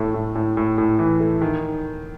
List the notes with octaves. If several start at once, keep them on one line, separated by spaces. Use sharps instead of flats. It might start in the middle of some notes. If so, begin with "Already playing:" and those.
Already playing: A2 A3
A2
A2
A2
A2
E3
A3
D#3